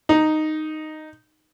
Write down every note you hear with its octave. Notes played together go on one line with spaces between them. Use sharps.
D#4